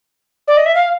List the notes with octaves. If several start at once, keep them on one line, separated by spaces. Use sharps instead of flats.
D5
D#5
E5
F5